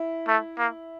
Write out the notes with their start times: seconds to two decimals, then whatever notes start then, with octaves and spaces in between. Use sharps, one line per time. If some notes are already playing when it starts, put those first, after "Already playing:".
Already playing: E4
0.28 A3
0.58 A#3